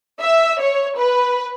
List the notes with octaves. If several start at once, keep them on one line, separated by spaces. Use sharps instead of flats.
E5
C#5
B4